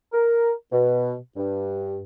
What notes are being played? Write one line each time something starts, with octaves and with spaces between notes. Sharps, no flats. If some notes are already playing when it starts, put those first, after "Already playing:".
A#4
B2
G2